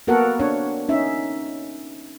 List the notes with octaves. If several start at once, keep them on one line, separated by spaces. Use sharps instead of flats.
A#3 B3 F#4 A4 A#4 F#5
C4 D4 C#5
C#4 D#4 E5